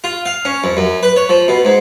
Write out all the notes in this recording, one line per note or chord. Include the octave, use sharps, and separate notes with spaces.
F4
F5
C#4
F2
F#2
B4
C#5
F3
B2
G#2